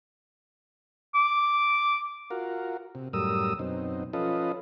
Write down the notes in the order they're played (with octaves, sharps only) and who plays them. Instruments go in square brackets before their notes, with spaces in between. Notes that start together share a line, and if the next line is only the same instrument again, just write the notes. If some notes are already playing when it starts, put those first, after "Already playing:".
[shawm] D6
[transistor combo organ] F4 F#4 A#4
C3
F#2 A2 G3 A#4 D#6 E6
F#2 B2 C4 D#4
F3 C#4 F4 A4 B4 D#5